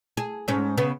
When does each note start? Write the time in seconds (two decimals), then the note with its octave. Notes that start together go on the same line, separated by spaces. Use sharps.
0.17 G#4
0.48 G#2 C#4
0.78 C#3 B3